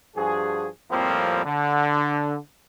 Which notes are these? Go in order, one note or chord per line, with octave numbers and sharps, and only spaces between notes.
G2 F3 F#4 G#4
F2 A2 F3 G3 A#3 C4
D3